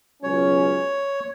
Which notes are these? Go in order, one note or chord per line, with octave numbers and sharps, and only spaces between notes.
C#2 B2 F#3 C#4 C#5